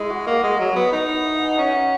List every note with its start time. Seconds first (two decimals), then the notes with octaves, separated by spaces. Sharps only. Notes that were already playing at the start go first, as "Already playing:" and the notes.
Already playing: G#3 E4
0.10 F#4
0.26 A#3 A#4
0.43 G#3
0.60 F#3
0.76 B3
0.92 D#4 A#4
1.09 B4
1.25 E5
1.34 F#5
1.42 G#5
1.50 A#5
1.58 C#4 G#5
1.66 F#5
1.75 D#5